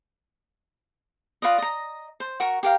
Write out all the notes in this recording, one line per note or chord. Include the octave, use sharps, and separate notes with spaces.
F4 B4 D5 D#5
D#5 A#5
C5
F#4 A#4 C#6
G4 A#4 F5